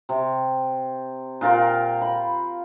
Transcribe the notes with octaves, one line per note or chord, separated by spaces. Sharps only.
C3
A#2 F4 A#4 G5
B5